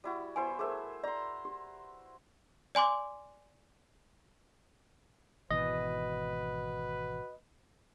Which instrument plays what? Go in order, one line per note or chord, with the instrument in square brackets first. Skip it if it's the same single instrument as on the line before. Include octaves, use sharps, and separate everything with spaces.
[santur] G3 E4 F#4
[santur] B3 E4 C5 [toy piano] G#5
[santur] A3 C5 E5 [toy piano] G#4 A#4
[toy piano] D5 [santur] A#5 C6
[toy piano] G4
[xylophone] D5 G#5 C6 D6
[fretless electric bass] G#1 B2 E3 [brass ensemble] F#4 B4 [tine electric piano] D#5